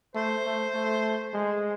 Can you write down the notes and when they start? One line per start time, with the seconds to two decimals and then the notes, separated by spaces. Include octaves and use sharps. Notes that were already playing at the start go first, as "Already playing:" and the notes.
0.15 A3 C5
0.46 A3
0.74 A3
1.34 G#3